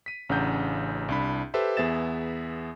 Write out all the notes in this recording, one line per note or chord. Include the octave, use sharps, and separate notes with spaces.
B6 D#7
A1 C#3 D4 F#5 A#5 G6
C2 D4 B5
G4 A4 B4 C5 E5
E2 B3 G#4 E5 A6 E7